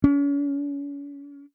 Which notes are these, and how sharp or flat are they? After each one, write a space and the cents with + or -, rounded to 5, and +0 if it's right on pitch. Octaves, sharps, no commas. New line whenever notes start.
C#4 +40